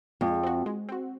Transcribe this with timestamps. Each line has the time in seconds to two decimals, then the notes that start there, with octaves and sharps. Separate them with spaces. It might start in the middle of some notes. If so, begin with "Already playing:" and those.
0.21 F2 G#3
0.43 C4 F#4
0.66 G#3
0.89 C4 F#4